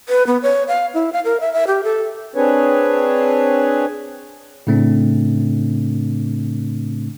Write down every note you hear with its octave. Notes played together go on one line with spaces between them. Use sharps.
B4
B3
C#5
F5
E4
F5
A#4
E5
E5
G4
A4
C4 D4 G#4 B4 C#5
A2 C#3 A3 C4 D4